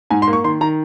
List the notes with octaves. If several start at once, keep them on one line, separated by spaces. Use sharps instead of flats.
G#2 G#5
C6
A#3
C#6
D#3 C6
D#3 A#5